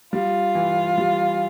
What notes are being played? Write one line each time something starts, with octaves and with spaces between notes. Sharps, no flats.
G3 F4
E3
G3